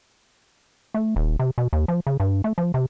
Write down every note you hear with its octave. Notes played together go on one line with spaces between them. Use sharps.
A3
D#1
C3
B2
D#2
F3
C#3
G2
A3
F3
C3